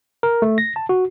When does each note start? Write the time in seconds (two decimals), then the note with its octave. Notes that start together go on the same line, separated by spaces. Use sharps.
0.23 A#4
0.42 A3
0.58 A#6
0.76 A5
0.89 F#4